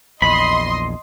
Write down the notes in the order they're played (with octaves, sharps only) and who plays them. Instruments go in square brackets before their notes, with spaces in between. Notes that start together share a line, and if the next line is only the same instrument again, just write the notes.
[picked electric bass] A#1 E2 [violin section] D#5 C6 [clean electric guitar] B5